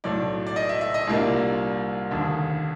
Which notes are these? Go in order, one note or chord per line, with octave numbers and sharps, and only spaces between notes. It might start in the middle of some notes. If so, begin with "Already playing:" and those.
B1 A2 F#3 A3 D5
D5
D#5
E5
E5
D#5
C2 A#2 G3 A#3 D4
F1 D#2 D3